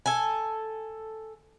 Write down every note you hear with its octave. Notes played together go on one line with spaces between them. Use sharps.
A4 G#5